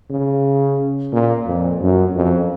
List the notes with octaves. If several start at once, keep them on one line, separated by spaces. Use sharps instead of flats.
C#3
A#2
F2
F#2
F2